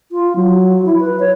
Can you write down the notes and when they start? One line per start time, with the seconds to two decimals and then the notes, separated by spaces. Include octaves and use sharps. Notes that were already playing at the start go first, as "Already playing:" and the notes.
0.12 F4
0.36 F#3
0.85 E4
1.00 B4
1.19 C#5